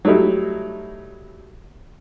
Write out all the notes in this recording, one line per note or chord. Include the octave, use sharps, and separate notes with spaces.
F#3 G3 A3 D#4 E4